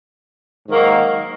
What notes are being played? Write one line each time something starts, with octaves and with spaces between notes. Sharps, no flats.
G#2 D#3 F#3 A#3 D#4